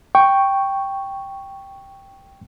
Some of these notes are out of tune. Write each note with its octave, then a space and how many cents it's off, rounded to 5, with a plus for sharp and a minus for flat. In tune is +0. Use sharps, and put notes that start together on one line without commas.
G5 +0 C#6 +0